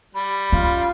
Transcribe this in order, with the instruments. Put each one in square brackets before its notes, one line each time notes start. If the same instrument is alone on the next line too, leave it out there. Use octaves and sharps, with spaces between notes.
[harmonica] G3 [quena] B5
[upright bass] C#4 [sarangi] F4